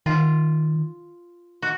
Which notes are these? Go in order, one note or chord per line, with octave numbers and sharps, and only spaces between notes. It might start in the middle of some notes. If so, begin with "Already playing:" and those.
D#3 F4
F#4